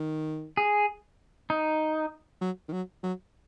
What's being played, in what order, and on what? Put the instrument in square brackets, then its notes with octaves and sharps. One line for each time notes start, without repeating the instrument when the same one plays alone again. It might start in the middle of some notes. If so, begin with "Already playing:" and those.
Already playing: [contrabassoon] D#3
[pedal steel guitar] G#4
D#4
[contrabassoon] F#3
D#3
F#3
F#3